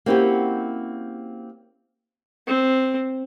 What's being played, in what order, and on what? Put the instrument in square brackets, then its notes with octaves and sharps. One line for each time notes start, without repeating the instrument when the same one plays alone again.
[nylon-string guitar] A#3 C4 C#4 E4 F#4 G4
[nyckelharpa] C4